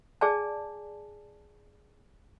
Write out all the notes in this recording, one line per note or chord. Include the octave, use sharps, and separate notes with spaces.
G#4 D5 G#5 A5